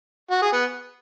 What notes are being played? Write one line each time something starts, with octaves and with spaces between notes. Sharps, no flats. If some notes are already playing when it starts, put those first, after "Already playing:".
F#4
G#4
B3